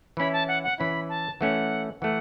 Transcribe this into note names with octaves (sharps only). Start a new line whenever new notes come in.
E3 C#4 E4 B5
A5
F#5
F#5
E3 C#4 E4 B5
A5
E3 A3 C#4 F#5
E3 A3 F#5